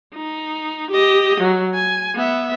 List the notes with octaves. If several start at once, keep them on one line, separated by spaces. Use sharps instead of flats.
D#4
G4 D#5
F#3
G#5
B3 E5